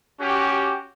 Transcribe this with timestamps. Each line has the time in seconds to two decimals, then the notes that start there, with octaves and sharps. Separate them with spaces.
0.20 C#4 F#4 G4